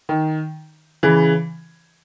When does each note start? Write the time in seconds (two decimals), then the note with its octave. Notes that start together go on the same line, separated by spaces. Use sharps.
0.09 D#3
1.03 C#3 E3